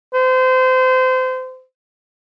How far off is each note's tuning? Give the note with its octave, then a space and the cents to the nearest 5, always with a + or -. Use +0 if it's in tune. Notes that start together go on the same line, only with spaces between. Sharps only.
C5 -30